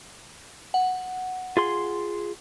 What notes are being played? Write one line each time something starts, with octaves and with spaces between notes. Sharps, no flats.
F#5
F4 G#4 C6